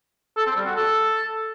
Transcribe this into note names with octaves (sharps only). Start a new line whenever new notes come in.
A4
C4
G3
F#4
A4